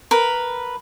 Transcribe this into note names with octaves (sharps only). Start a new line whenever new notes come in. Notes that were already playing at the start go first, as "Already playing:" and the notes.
A#4 B4